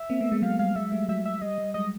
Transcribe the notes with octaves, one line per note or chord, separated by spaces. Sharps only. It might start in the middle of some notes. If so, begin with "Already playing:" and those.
Already playing: E5
A#3 C4
A3 B3
G#3 A#3
F#3 G#3 F5
G3 F5
F#3 G#3 E5
G3 A3
F#3 E5
E5
G3 D#5
G3
F#3 G#3 D#5